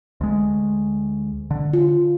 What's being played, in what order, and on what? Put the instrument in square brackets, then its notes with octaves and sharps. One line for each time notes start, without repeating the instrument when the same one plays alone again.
[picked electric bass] D2 G#3
D3
[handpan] F4